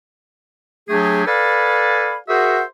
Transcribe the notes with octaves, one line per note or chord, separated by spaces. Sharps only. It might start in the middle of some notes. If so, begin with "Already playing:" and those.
F#3 A3 D4 G4 G#4
A4 B4 D5 F5 G#5 B5
F#4 G#4 A#4 C5 E5 F#5